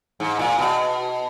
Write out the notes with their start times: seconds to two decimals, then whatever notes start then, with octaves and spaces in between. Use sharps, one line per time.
0.20 G#2
0.39 A#2
0.59 B2